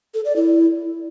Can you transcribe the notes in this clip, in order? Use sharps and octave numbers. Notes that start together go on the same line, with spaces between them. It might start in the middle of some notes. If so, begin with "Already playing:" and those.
A4
D5
E4